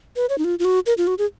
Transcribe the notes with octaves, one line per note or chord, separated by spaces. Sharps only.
B4
C#5
D#4
F4
F4
F#4
A#4
F4
F#4
G#4